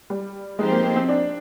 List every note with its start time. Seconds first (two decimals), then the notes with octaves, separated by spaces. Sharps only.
0.10 G3
0.59 F3 G#3 C4 D#4 G4 C5
0.71 A#3
0.84 A#3
0.96 C4
1.08 D4